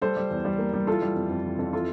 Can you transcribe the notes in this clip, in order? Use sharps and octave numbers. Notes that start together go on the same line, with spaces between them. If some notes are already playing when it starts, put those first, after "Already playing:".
G3 A4 C5
G3
E2
G3
A#3
G3
E3 F4 A4
G3
F2
F2
E3
F2
E3 F4 A4